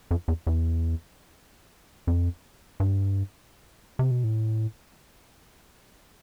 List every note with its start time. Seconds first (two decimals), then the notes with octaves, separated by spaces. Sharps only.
0.11 F2
0.28 E2
0.47 E2
2.07 F2
2.80 G2
3.99 C3
4.11 B2
4.24 A2